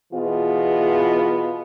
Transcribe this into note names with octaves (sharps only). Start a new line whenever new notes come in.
B2 E3 B3 F4 G#4